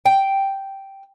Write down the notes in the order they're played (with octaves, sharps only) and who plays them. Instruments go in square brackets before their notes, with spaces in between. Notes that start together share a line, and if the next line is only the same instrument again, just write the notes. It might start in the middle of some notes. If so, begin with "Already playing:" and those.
[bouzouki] G5